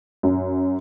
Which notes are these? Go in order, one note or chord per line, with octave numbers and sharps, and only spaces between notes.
F#2